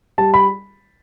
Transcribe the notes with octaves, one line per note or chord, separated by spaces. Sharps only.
G3 A5
B5